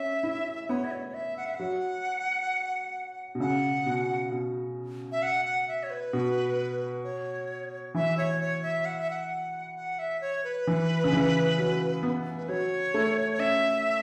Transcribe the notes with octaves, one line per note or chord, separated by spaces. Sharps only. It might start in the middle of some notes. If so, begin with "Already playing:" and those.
Already playing: C#4 E5
E4
B3 C#5
E5
C#5
C#5
E5
F#5
E5
F#3 F#5
B2
C#3 F#5
B2
B2
E5
F#5
F#5
E5
C#5
B4
B2
C#5
E3 E5
C#5
C#5
E5
F#5
E5
F#5
F#5
E5
C#5
B4
E3
C#3
E3
F#3
B3
B4
F#3 C#5
A3
C#5
C#4 E5